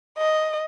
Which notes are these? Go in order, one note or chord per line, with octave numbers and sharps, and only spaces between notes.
D#5